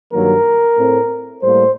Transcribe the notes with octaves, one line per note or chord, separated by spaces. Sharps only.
G2 D#3 F#3 A#3 A#4
A2 A3 C4
A2 G3 A#3 C5